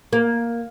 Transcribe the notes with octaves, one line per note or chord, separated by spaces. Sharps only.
A#3